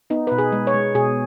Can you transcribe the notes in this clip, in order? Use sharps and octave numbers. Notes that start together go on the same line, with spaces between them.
B3 D#4
B2 B4
G#4
G#3
C#5
G#3
B2 G#4